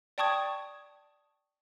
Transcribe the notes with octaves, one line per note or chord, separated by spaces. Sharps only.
D5 G5 A5 C#6 D#6 G#6